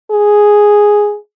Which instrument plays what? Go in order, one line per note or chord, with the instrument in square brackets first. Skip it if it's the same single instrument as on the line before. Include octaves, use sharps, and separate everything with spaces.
[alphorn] G#4